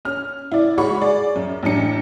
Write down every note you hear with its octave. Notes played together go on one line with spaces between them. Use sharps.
C#4 F6
E4 D5
G#2 G#3 F#4 C#5 B5 C#6
G#4 D5
F#2
A1 F#2 D4 C#7